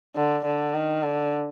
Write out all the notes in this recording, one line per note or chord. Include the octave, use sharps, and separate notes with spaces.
D3
D3
D#3
D3